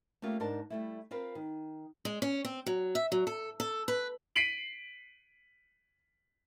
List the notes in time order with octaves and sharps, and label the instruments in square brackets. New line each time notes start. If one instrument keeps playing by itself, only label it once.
[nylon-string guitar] A3 A#3 C#4 F4 G4
G#2 D4 A#4 C5 A5
G3 A3 E4
C4 F4 A#4 B4
D#3
[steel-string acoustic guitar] G#3
C#4
C4
F#3
E5
F#3
A4
A4
B4
[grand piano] B6 C7 D7 D#7 F#7